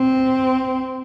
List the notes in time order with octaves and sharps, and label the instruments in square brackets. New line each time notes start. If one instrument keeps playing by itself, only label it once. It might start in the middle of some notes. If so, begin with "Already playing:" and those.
Already playing: [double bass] C4